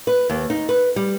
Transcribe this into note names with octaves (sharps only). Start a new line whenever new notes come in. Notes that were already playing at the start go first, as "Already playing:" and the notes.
B4
D#2
D#4
B4
G3